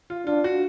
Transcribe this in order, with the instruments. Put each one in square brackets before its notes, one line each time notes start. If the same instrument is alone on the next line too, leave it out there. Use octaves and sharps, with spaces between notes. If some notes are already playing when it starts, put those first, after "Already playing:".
[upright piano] F4
[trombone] D4 [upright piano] F4
[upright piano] F#4